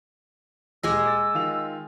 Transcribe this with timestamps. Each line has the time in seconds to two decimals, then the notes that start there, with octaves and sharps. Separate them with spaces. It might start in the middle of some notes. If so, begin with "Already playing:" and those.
0.83 D#1 G#3 G4 G#4 D#5 D6 E6
1.05 D6 A6
1.34 D#3 F4 F7